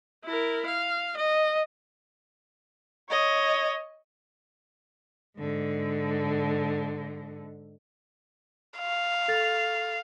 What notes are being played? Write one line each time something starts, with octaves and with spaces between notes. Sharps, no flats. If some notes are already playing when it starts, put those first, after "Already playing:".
E4 A#4
F5
D#5
C#5 D#5
G#2 D3
F5
A4 A6 F7